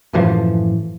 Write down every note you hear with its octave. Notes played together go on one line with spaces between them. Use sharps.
F#2 A2 E3 F3